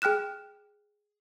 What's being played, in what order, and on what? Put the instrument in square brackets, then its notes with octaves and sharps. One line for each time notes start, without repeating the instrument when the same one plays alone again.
[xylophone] G#4 G5 F6 F#6 E7